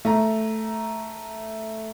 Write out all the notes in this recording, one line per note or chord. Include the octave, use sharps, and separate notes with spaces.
A3 A#5